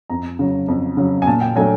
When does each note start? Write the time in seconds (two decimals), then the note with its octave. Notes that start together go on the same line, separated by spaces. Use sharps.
0.10 F2 A#5
0.39 C#3 F#3
0.68 F2
0.97 C#3 F#3
1.22 G#5
1.27 A#2 A5
1.41 G5
1.55 F#3 A3 D4 G#5